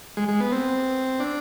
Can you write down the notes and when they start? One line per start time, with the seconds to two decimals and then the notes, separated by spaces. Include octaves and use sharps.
0.17 G#3
0.28 G#3
0.40 B3
0.52 C4
1.20 D4